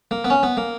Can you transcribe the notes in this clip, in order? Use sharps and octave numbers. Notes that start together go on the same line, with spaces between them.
A#3
B3
C#4
B3
A#3